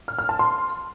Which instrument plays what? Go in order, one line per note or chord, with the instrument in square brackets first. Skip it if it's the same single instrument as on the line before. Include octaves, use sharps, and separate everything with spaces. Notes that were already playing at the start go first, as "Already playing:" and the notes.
[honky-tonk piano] F6
F6
A5
C6